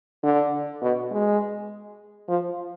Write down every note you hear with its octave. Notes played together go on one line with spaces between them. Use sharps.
D3
B2
G#3
F3